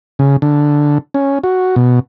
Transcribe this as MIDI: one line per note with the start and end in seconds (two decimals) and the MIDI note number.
0.19 0.37 49
0.42 0.98 50
1.14 1.39 61
1.44 1.75 66
1.76 2.00 47